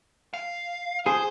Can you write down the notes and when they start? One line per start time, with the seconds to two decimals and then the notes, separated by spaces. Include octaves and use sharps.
0.34 F5
1.06 G#4 C5